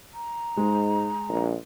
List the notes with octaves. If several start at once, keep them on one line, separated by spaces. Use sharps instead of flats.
A#5
G#2 G#3
A#1